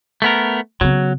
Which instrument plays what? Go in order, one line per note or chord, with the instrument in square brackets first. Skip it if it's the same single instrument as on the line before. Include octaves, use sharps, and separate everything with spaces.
[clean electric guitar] A3 B3 A#4
[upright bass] C#3 B3 [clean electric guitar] F#3